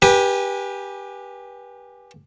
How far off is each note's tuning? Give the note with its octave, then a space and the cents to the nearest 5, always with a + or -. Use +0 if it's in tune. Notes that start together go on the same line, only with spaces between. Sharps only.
G4 +10 B4 -25 G#5 +0